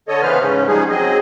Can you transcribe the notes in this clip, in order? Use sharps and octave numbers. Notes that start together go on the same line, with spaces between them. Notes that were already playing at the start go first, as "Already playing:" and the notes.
D3 A4 C#5 D#5
C#3 E3 B3 B4 C5 F6
G#2 C#3 C#4
F3 G3 G#3 D#4 G#4
F#3 C4 G#4 D#5